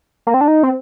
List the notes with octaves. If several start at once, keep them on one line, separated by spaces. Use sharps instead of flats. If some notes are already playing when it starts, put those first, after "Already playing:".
A#3
C4
D4
D#4
C4